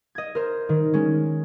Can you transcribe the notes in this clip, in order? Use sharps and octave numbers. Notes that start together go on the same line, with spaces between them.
D#5 G#6
A#4 C5
D#3
G#3 C#4